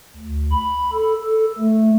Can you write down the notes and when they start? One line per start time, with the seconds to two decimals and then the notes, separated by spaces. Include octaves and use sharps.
0.16 D2
0.51 B5
0.93 A4
1.24 A4
1.59 A3